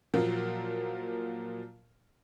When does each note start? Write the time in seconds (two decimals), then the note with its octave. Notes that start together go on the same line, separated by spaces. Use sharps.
0.14 A#2 F3 F#3 A#3 F4 A#4